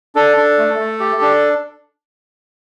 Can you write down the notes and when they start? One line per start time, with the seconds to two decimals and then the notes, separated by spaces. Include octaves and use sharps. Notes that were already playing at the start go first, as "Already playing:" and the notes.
0.15 D4 A4
0.37 D4
0.58 A3
0.79 A3
1.00 G4
1.21 D4